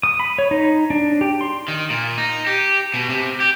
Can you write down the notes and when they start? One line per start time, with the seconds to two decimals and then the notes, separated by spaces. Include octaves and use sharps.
0.03 D#6
0.20 B5
0.38 C#5
0.51 D#4
0.90 D4
1.21 G4
1.41 C6
1.68 D#3
1.90 A#2
2.18 D#4
2.47 G4
2.94 B2
3.09 C3
3.40 G4